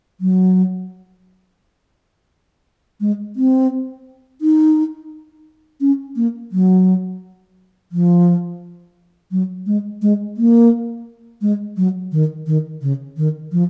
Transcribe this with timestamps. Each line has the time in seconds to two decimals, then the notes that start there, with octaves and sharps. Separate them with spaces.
0.20 F#3
3.00 G#3
3.36 C4
4.41 D#4
5.81 C#4
6.16 A#3
6.52 F#3
7.92 F3
9.31 F#3
9.66 G#3
10.02 G#3
10.37 A#3
11.41 G#3
11.77 F#3
12.12 D#3
12.47 D#3
12.82 C#3
13.17 D#3
13.52 F3